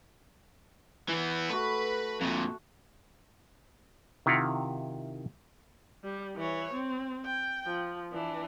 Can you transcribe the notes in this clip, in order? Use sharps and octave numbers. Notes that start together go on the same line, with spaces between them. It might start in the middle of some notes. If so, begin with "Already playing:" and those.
E3 B3
A3 F#4 B4
F2 A#2
C3 D#3 E4 F4 F#5 A#5
G3
E3 C#5
C4
G5
F3
E3 D4